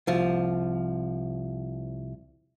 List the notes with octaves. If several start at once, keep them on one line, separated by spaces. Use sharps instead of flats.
C2 F3